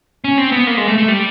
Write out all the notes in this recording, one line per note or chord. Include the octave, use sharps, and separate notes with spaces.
C#4
C4
B3
A#3
G#3
A3
A3
G3